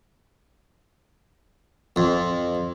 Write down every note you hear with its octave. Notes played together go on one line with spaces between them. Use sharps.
F2